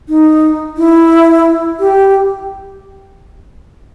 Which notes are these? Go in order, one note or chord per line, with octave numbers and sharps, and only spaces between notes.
D#4
E4
G4